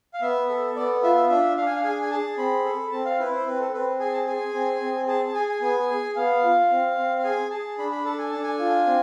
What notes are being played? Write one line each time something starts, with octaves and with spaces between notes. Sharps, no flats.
F5
B3 E5
A4
B3 D5
F4 E5
E5
D4 E5
D4 F5
G#5
F5
G#4 G#5
G#5
G#4 A5
C4 B5
A4
C4 A5
F5
E4 B4
C5
C4 B4
A4
C4 B4
G#4 G#5
A5
G#4 G#5
C4
C4
G#4 A5
A5
G#4 G#5
G#5
B3 G#5
G#4
B3 F5
F4
C4
C4
F5
G#4 G#5
G#4 A5
D4 B5
B5
A4 A5
G#5
D4 A5
G#5
F4
C4